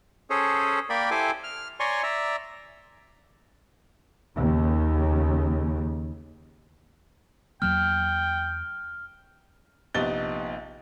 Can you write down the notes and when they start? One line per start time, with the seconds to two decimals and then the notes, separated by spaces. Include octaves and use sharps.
0.30 C#4 G#4 A4 C5 C#5
0.90 A#3 A#4 D5 G5 B5
1.11 E4 G4 A4 C5 G#5 D6
1.44 F6
1.80 C#5 D5 G#5 A#5 C6 C#6
2.03 D5 E5 A#5
4.37 D#2 C#3
7.62 E2 F#3 A#3 G5 F6
9.94 A#1 C3 B3 D#4 A6 G7